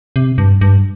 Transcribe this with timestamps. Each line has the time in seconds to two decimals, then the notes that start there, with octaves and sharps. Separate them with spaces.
0.16 C3
0.38 G2
0.61 G2